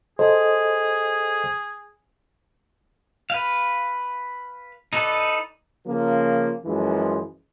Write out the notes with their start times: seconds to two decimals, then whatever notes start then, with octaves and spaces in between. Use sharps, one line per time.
0.19 G#4 A4 C5 D#5
3.30 B4 F5
4.93 D#4 A4 B4 D5
5.86 C#3 F3 A#3
6.65 F#2 E3 F3 G#3